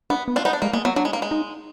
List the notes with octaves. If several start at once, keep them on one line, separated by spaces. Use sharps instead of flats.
B3 D4
B3
D4 F4
B3 D#4
D4
G#3 A#3
G#3 A#3
F#3 B3
F#3 D4
G#3
A#3
G#3
D#4